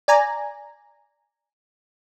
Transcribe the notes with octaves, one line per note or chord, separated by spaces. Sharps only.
D5 G#5 A#5